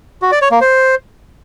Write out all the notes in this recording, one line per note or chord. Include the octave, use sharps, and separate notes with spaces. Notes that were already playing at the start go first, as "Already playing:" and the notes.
F#4
D5
C#5
A#3
C5